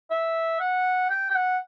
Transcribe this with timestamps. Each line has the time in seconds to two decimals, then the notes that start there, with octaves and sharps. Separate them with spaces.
0.10 E5
0.60 F#5
1.10 G5
1.30 G5
1.35 F#5